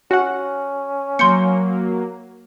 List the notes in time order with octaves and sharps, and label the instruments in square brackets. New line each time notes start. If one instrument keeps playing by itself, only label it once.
[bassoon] C#4 [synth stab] F#4 F#5
[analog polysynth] F#3 A#3 [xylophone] C6 G6 C#7